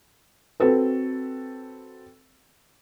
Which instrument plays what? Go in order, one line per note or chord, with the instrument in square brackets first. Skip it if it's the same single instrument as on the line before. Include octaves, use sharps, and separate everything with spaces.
[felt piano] C4 F#4 A4 B4